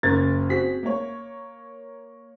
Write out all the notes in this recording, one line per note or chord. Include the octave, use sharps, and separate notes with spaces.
F#1 C#3 A#4 G#6 A6
C4 F#4 G#4 B6
A#3 C#5